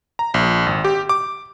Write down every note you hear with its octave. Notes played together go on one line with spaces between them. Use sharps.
A#5
A#1
G#1
G4
D6